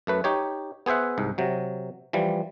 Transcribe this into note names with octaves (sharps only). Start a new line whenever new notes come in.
F#2 A3 B4
D#4 G4 C#5
B3 G#4 C5 E5 F#5
C2 G#2
C3 F#3
E3 F3 G3